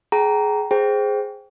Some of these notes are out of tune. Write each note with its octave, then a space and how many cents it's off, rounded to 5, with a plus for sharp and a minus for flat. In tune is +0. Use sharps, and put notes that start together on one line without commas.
G#4 +20 G5 -35 A#5 +0
G#4 +0 C5 +0 G5 -5